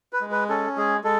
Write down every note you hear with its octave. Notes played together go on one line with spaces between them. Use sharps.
B4
G#3
B4
C#4 A4
G#3 G#4
G#3 A4